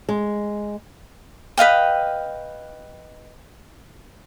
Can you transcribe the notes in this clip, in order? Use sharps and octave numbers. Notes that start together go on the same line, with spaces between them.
G#3
B4 D#5 F5 G5